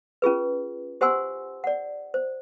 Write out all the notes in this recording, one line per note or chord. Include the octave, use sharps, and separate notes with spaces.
C#4 F4 G#4 B4
G4 C5 F#5 G#5 C6 E6
D5 F#5
C5